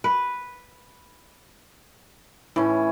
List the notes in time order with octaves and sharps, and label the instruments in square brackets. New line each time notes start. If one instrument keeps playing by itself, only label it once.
[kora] B4
[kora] A2 [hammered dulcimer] E3 C#4